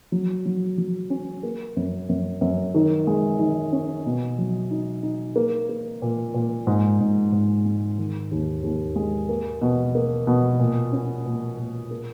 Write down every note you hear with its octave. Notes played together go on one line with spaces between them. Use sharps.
F#3
F#3
F#3
C#4
A#3
F#2
F#2
F#2
D#3
G#3
D#3
C#4
B2
F#3
D#4
D#4
A#3
A#3
A#2
A#2
G#2
G#2
G#2
G#3
D#3
D#2
D#2
G#3
A#3
B2
A#3
B2
A#2
C#4
A#2
A#2
A#3